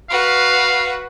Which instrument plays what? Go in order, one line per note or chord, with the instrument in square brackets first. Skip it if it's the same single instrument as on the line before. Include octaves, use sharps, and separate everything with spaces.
[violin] F#4 B4 [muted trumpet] F5